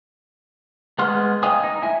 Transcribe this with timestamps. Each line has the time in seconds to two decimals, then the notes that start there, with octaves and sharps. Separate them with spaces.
0.99 G#3 B3 F#5 C6 F6
1.43 D#5 F5 G5 G#5 D#6
1.63 D#4
1.82 E4 E5 G#5